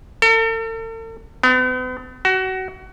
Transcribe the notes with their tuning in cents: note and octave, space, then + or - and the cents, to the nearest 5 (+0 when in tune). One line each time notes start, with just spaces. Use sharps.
A4 +45
B3 +45
F#4 +25